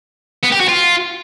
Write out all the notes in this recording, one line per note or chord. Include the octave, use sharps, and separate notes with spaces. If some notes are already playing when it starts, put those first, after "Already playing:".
B3
G4
F#4
F4